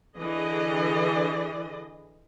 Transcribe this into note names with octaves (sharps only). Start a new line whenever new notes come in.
D3 E3 G#4 D#5